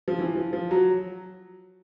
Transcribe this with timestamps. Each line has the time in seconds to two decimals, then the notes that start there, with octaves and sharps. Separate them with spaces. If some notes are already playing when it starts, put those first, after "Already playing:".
0.08 F3
0.19 E3
0.35 F3
0.53 F3
0.71 F#3